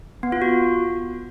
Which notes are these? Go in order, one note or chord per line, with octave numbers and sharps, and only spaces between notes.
B3
F4
F#4